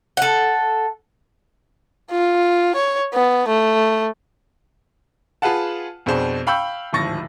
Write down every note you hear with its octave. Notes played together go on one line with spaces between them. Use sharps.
A4 F#5
F4
C#5
B3
A3
F4 G#4 B4 F5 F#5 A5
F2 B2 D4 F#4 G#4 C5
F5 G5 B5 C#6 E6 G6
D1 G#1 F3 C#6 A6 A#6